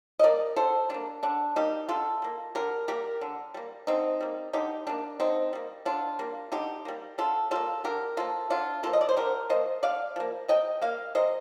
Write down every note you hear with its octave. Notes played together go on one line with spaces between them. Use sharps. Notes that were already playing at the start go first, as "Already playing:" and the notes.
D#5
G3 A#3 A#4 D5
D3 A4 C5
G3 A#3 D4
D3 D4
G3 A#3 D#4 G4
D3 F4 A4
G3 A#3
D3 G4 A#4
G3 A#3 G4 A#4
D3
G3 A#3
D3 C4 D#4
G3 A#3
D3 D#4 G4
G3 A#3 D4
D3 C4 D#4
G3 A#3
D3 D4 F4
G3 A#3
D3 D#4 G4
G3 A#3
D3 F4 A4
G3 A#3 F4 A4
D3 G4 A#4
F3 A#3 F4 A4
D3 D4 F4
F3 A#3 F4 A4
D#5
D5
C5
D3 G4 A#4
F3 A#3 C5 D#5
D3 D5 F5
F3 A#3
C3 D#5 G5
G3 A#3 F5
C3 C5 D#5